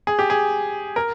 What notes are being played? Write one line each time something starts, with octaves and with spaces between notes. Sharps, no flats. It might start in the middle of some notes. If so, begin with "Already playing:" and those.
G#4
G4
G#4
A#4